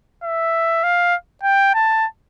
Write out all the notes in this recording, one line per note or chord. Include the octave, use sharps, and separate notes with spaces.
E5
F5
G5
A5